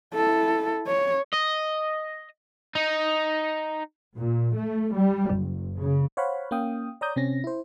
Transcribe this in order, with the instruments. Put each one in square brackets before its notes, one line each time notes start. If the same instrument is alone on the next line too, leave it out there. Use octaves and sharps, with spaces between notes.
[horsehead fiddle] E4 A4
C#5
[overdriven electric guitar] D#5
D#4
[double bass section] A#2
A3
G3
F#1
C#3
[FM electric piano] C5 C#5 F5 F#5 B5
A#3 C#4 F5 G5 D#6
C#5 D5 A#5 D#6 G6
C3 C4 C#4 A#6
E4 C5